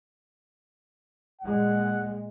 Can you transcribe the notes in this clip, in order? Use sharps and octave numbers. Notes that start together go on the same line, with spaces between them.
A#2 G#3 F#5